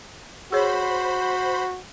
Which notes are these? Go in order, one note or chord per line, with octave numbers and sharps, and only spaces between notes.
F#4 G#4 C5 C#5 B5